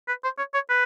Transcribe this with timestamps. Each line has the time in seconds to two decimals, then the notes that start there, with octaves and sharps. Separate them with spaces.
0.08 B4
0.24 C5
0.38 C#5
0.54 C#5
0.69 B4